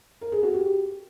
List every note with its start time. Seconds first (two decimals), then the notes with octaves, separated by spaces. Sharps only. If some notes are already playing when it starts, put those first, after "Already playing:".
0.21 A#4
0.32 G#4
0.43 F#4
0.53 G4